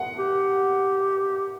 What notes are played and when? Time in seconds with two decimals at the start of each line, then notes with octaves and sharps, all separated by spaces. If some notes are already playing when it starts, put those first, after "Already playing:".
Already playing: F#5
0.19 G4